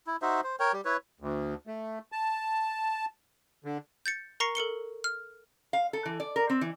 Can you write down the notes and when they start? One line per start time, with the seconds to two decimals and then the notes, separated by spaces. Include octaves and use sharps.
0.07 E4
0.22 D#4 F#4 C5 E5
0.43 C5
0.60 A#4 C#5 G5
0.73 G3 G4
0.85 E4 B4 C#5
1.20 D2
1.67 A3
2.12 A5
3.64 D3
4.06 G6 A6 C#7
4.40 A#4 A#5 C#6 A#6 C7 C#7
4.55 A4 A#4 C#7 G7
5.04 F6
5.73 F5
5.93 A4
6.05 E3
6.20 D5
6.36 A#4
6.50 C4
6.61 E3